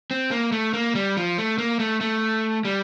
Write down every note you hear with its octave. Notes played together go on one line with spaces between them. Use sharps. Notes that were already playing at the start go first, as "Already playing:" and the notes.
C4
A#3
A3
A#3
G3
F3
A3
A#3
A3
A3
G3